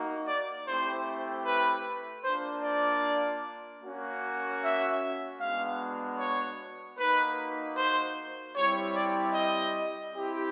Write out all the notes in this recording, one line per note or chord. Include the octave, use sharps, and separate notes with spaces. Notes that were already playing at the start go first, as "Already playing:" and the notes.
Already playing: A#3 D#4 F#4
D5
A3 C4 E4 G4 C5
B4
A#3 D4 F4 C5
D5
A#3 C#4 F#4
E5
G#3 B3 D4 F#4 F5
C#5
A#3 D#4 F#4 B4
C5
G3 C4 E4 G4 C#5
D5
D#5
C4 E4 G4